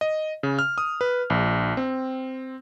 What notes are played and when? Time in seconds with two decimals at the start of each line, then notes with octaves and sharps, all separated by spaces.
0.01 D#5
0.43 C#3
0.59 F6
0.78 D#6
1.01 B4
1.30 A#1
1.77 C4